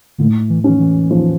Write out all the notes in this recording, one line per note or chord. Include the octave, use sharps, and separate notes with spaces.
A2 D3
E3
E3 C#4
E3
F3